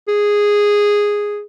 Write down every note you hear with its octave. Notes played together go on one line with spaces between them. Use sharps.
G#4